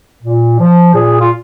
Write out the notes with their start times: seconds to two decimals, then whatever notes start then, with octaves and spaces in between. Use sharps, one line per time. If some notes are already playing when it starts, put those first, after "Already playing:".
0.23 A#2
0.60 F3
0.94 A#2 G#4
1.20 F4